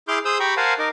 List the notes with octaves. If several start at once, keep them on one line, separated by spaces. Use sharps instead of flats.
E4 G#4 C6 D6 F6 G6
G#4 C5 D#6 E6 G6
G4 G5 A#5 B5 C#6
A#4 C5 F5 F#5 G#5 A5
D#4 A#4 D6